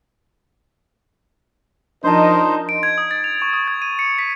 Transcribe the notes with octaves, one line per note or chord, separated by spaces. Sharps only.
F3 D4 D#4 A#4 C5 D#5 A5
D7
G#6
D#6
A6
F7
C#6
D#6
G#6
D#7
C#7
B6